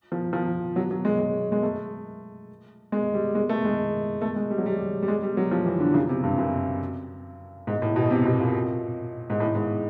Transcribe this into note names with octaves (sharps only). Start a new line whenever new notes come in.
F3
F3
F#3
F#3
G#3
G#3
G#3
A3
G#3
G3
G#3
A3
G#3
A3
G#3
G3
F#3
G3
G3
G#3
G3
F#3
F3
E3
D3
C#3
C3
G2
F#2
G#2
A2
B2
C3
B2
A#2
G#2
A2
G#2